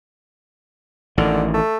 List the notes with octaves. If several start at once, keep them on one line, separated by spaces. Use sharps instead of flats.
A1 D3 D#3
A3